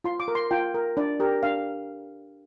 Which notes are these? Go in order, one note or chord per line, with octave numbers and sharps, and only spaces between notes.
F4 C6
D6
A#4
C6
F4 G5
A#4
D4 D5
G4 A#4
D4 F5